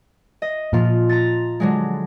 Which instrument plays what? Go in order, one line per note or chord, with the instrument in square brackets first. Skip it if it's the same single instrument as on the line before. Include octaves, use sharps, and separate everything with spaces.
[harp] D#5
[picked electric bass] A#2 [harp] F3 F4
[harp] A#5 A6
D3 F#3 G#3